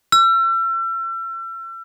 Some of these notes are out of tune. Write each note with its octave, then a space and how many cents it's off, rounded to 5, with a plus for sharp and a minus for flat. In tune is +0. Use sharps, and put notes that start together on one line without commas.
E6 +40